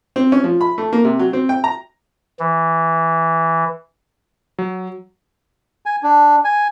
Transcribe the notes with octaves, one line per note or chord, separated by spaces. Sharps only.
C4
C#4
F3
B5
A3
A#3
C3
F#3
C4
G5
A#5
E3
F#3
G#5
D4
G#5